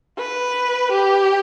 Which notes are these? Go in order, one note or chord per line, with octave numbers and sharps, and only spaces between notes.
B4
G4